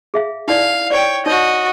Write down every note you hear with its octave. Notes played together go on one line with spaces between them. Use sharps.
G#4 E5 F5
D#4 E4 D5 F5
C#5 D5 G5
D#4 F#4 C#5 D#5